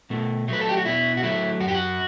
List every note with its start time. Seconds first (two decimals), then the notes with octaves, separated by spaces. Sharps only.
0.10 B2 A3
0.48 F#3 A3 B4
0.61 A4
0.69 G4
0.77 F#4
0.85 B2 E4
1.17 F#4
1.23 F#3 A3 E4
1.60 F#2 F#4
1.68 G4
1.75 F#4